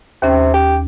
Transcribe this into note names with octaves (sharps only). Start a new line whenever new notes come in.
D#2 C3 C#4 G5
G4